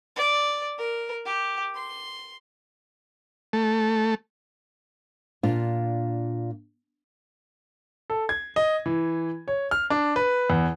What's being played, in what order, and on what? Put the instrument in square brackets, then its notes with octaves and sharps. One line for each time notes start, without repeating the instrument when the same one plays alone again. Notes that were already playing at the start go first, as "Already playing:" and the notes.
[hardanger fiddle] D5
A#4
G4
C6
[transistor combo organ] A3
[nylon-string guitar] A#2 D4 F4
[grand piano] A4
G#6
D#5
E3
C#5
F6
D4
B4
E2